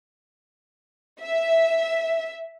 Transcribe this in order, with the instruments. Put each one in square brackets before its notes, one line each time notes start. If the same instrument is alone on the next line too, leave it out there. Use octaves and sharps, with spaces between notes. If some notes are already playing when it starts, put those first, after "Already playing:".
[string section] E5